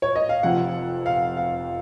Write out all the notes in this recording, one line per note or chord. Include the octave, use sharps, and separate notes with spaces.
C#5
D#5
F5
F1 F2 C3 F3 F#5
F5
F5